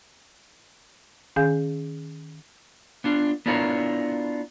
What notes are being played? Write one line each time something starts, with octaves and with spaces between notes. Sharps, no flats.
D#3 C#4 G#4 F5 G#5 G6
B3 D4 F4
B3 D4 E4 F4 A#4 C#5